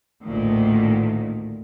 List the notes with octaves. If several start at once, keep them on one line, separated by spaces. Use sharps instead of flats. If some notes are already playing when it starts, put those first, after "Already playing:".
A1 D2 A#2 D#3